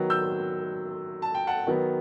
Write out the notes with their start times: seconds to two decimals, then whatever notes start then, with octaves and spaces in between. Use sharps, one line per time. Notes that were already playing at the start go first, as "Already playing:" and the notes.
Already playing: D#3 F#3 B3
0.10 E6 G6
1.22 A5
1.35 G5
1.47 F#5 A5
1.67 D#3 F#3 B3